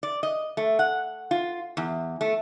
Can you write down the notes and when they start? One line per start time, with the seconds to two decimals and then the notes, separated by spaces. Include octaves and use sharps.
0.03 D5
0.23 D#5
0.57 A3
0.79 F#5
1.31 F4
1.77 E2
2.21 A3